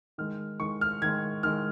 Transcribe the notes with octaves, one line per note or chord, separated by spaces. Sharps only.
D#3 G#3 F6
D#3 G#3 C#6
F6
D#3 G#3 G#6
D#3 G#3 F6